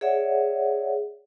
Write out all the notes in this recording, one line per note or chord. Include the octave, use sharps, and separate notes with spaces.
G#4 C#5 D5 E5 F#5